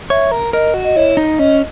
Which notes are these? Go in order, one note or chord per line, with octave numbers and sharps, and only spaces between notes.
C#5 E5
A#4
A#4 D#5
F#4
D#5
E4 C#5
D#4
C#4 D#5